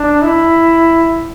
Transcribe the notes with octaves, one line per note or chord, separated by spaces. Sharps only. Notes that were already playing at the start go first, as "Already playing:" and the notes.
Already playing: D4
E4